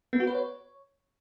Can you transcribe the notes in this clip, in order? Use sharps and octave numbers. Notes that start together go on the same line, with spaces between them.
B3
F#4
B4
C#5